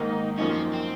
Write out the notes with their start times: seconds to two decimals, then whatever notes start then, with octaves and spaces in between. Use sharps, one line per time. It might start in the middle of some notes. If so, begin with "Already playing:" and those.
Already playing: G#2 D#3 A#3 D#4
0.38 F#2 F3 A#3 C#4 D#4
0.49 C4
0.73 C4